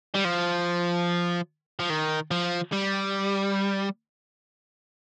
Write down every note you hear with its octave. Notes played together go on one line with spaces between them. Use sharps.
G3
F3
F3
D#3
F3
G3